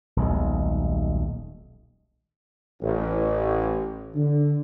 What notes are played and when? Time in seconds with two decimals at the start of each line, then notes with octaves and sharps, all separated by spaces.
0.16 D#1 B1 G#3
2.81 A1
4.15 D3